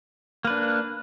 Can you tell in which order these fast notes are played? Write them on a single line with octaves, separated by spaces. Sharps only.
A#3 B4 D4